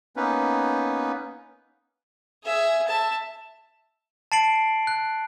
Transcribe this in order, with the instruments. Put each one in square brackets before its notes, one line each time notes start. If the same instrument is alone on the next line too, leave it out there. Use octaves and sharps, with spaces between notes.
[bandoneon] A#3 B3 C#4 D#4 B4
[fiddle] G#4 E5
E5 A5
[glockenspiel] A5 A6 C7 D7 F#7
F#6